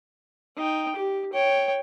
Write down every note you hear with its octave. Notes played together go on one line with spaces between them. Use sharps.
D#4 G5
G4
C#5 G5